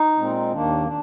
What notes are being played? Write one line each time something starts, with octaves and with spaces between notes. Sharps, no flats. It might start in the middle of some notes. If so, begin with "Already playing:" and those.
Already playing: D#4
A#2 G#3 C4
D#2 D#3 A#3 D4
D4